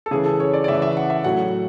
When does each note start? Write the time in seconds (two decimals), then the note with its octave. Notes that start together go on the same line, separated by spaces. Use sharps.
0.06 A4
0.11 C#3 E3 G#4
0.26 A4
0.40 C#5
0.54 D5
0.64 D5
0.68 C#3 E3 E5
0.82 E5
0.97 F#5
1.10 E5
1.24 A2 F#3 F#5